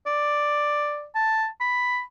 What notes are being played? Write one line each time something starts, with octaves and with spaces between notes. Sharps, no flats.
D5
A5
B5